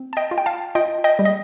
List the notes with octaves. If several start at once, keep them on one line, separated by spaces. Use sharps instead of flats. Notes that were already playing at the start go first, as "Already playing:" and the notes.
Already playing: C4
A5
D#5 G5
F4
G5
F5 A5
F4 D#5 G5
D#5 G5
G3
D#5